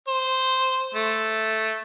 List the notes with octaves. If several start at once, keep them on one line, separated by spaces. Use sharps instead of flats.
C5
A3